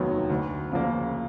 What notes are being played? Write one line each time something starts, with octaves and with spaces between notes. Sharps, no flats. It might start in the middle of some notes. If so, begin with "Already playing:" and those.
Already playing: F1 D#2 D#3 F#3 B3
D2
C#3 F3 A#3